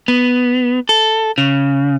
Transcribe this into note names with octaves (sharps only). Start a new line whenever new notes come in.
B3
A4
C#3